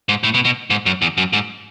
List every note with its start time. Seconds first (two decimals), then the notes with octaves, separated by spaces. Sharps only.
0.09 G#2
0.23 A2
0.34 B2
0.45 B2
0.70 G#2
0.86 F#2
1.02 E2
1.17 F#2
1.33 G#2